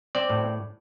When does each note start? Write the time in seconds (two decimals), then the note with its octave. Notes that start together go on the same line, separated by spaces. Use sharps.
0.15 C4 D5
0.30 A2